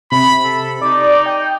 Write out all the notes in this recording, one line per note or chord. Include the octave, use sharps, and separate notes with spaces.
C3 B5
A4
D#4 D5
G5